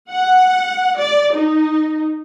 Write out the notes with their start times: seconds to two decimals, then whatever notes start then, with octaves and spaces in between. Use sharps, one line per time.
0.10 F#5
0.97 D5
1.35 D#4